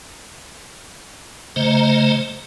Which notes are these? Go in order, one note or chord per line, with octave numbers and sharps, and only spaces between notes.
C#3 A3 C5 D#5 A#5